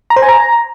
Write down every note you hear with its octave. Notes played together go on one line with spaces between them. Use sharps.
A#5
C5
G#5
A#5